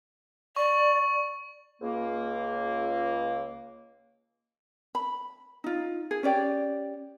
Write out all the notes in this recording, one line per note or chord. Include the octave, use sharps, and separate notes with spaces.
D5 C#6
C#2 A#3
B5
D#4 F4
G#4
C#4 G4 D5 G5